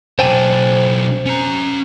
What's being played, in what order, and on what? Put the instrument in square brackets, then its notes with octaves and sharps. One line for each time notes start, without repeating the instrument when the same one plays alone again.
[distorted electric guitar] B1 D4 [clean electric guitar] C5 G5 G#5
[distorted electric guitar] C#4 A#5